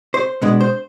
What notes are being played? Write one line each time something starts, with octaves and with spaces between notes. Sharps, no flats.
C5
B2 G#3 B3 D4
C5